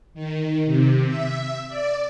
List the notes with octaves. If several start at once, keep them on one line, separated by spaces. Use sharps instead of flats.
D#3
C3
E5
D5